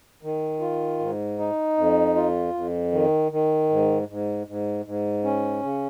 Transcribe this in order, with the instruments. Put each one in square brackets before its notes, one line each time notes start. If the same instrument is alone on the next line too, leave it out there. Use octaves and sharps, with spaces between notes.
[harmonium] D#3
F4
G#2
D#4
F2
F4
F2
D#3
D#3
G#2
G#2
G#2
G#2
C#4
C#3